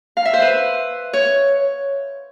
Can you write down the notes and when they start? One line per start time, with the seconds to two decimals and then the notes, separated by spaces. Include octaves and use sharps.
0.17 F5
0.25 E5
0.33 C5
0.42 B4
1.13 C#5